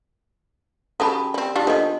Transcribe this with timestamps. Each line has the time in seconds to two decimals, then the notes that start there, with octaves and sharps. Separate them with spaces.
1.00 C#3 F#3 G4 A4 A5 B5
1.34 G3 C4
1.56 G3 D4 F4 G4
1.67 F3 B3 D4 A4 D#5